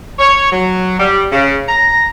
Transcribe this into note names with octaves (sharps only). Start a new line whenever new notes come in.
C#5
F#3
G3
C#3
A#5